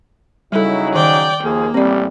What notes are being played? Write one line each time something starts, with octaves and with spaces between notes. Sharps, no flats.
C#3 F#3 G3 D#4 E4 A4
D#3 D5 G5
D#2 F3 A#3 G#4
A1 G3 C4 D5